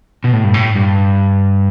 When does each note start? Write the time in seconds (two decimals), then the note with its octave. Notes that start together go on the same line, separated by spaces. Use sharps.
0.24 B2
0.33 A2
0.44 G2
0.54 A2
0.76 G2